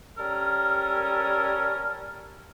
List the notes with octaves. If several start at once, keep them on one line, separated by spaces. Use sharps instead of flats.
G3 C#4 A4 A#4